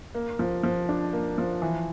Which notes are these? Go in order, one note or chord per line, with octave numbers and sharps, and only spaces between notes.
A#3
F3
F3
D4
A#3
F3
E3